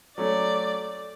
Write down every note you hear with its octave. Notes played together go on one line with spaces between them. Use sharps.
F#3 A3 C#4 D5